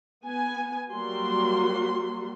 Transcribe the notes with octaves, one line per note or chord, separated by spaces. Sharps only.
B3 G#5
F#3 G3 A#3 F#4 C6